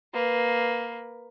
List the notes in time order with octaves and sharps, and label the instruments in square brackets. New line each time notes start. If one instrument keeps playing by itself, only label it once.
[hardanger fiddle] A#3 B4